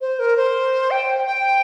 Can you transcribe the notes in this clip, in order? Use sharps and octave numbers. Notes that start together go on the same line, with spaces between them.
C5
A#4
C5
G5
G5